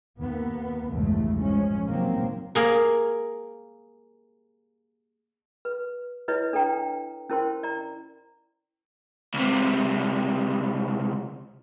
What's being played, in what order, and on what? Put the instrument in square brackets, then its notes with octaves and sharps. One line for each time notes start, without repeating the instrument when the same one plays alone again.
[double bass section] D#2 A#3 B3
A#1 E2 G2 C#3 G#3 A3
F3 G#3 C#4
C3 D#3 F#3 A#3 C4
[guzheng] A#3 G#4 A#4
[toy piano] B4
E4 B4 C#5 D#5
D4 A4 B4 G5 A#5
C#4 E4 A#4 C5 G5 C6
D5 A#5
[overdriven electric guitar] C#2 C3